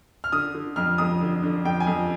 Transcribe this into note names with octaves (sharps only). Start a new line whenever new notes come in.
F6
D3 D#6
D3
F2 F6
F2 D#6
D3
D3
F2 G5
G#5
F2